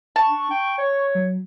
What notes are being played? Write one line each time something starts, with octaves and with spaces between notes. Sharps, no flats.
A5 C#6
D4
G5
C#5
F#3